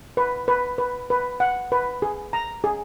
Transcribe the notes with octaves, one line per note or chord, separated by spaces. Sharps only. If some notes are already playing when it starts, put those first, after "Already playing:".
B4
B4
B4
B4
F#5
B4
G#4
A#5
G#4